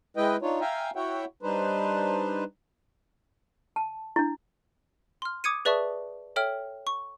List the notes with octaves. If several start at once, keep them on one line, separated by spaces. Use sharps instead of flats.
G#3 E4 B4 D#5 G5
D4 D#4 F4 C#5
E5 F5 G5 G#5 A#5
E4 F#4 C#5 E5 F#5 G5
G3 D4 D#4 B4 C5
A5
D4 E4
C6 F6
D6 D#6 G#6 C#7 D#7
G#4 B4 D5 E5 A5 C#6
A4 C#5 E5 G5 F6
C#6